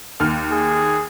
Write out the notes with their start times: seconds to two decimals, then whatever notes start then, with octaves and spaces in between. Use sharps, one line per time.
0.20 D#2 F6
0.51 G#4